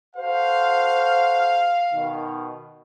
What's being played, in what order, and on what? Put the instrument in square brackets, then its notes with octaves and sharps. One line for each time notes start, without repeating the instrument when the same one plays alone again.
[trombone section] F#4 A4 C5 [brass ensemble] F5
[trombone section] B2 D#3